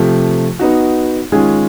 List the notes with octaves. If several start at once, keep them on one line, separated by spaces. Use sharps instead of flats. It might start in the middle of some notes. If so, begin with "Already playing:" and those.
Already playing: C3 F3 A3
B3 D#4 F#4
D#3 G#3 C#4 F4 G#4